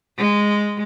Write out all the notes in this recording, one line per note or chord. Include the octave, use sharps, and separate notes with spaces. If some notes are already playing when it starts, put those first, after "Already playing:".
G#3